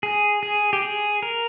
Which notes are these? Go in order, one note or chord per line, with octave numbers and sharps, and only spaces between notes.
G#4
G#4
G4
G#4
A#4